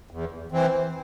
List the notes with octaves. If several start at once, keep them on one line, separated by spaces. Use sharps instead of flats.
E2
E3 C4